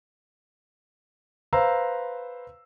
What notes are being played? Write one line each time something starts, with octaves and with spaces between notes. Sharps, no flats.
B4 C5 F5 A#5 E6